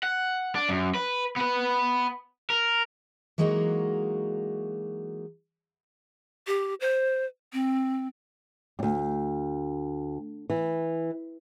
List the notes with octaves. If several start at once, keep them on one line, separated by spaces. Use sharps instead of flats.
F#5
D4
F#2
B4
B3 B4
A#4
E3 F#3 G#3 A#3 D#4 F#4
G4
C5
C4
D2 G2
E3